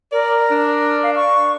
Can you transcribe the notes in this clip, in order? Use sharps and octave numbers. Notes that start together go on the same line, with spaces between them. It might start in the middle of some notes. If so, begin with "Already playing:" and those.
A#4 D5
D4
F5
C#6